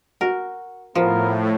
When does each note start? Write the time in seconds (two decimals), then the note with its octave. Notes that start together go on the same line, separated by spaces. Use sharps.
0.21 F#4 A#4
0.95 A2 F3 B3 F4 A#4